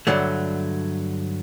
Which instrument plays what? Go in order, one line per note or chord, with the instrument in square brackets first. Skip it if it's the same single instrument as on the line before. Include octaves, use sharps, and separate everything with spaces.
[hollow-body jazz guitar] G2 D3 F#3 A3